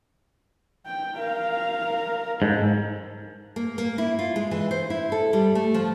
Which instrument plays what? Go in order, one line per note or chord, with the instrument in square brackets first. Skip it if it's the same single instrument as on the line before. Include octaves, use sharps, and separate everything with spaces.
[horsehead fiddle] G5
A#4 F5
[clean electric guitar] G#2 [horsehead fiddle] A4
[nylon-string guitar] A#3
A#3
E4
F4
G#3
E3
C5
E4
A4
G3
A3
F3